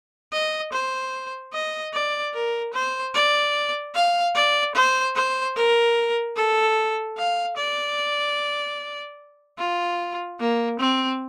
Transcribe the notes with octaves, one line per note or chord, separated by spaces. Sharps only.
D#5
C5
D#5
D5
A#4
C5
D5
F5
D5
C5
C5
A#4
A4
F5
D5
F4
A#3
C4